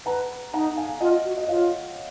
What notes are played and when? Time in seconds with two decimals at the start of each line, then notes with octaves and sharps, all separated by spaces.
0.06 B4 F#5 A#5
0.53 D#4 F#5 A#5
0.77 F5 G#5
1.01 F4 D#5 F#5
1.25 F#4
1.37 D#5
1.48 F4 C#5 F5